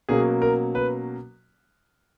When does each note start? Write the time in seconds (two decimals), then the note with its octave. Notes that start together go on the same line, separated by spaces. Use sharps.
0.09 B2 F#3 A#3 C#4 G#4
0.42 A#4
0.75 B4